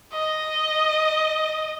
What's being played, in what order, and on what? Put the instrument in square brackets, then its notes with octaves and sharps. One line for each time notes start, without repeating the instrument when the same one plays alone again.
[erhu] D#5